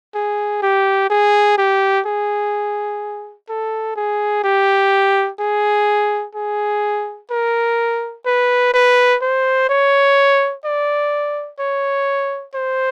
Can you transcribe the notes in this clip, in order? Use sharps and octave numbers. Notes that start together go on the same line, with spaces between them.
G#4
G4
G#4
G4
G#4
A4
G#4
G4
G#4
G#4
A#4
B4
B4
C5
C#5
D5
C#5
C5